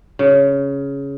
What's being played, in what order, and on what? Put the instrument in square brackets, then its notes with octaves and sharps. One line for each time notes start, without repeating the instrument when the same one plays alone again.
[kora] C#3